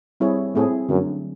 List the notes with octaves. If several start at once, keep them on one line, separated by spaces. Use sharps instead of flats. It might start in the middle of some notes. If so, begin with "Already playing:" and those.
G3 C4 E4 G#4 C#5
A2 C4 E4 G#4
F#2 D3 F#3 A3 D4